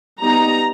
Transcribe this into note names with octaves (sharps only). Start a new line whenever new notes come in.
G3 B3 D#4 A#5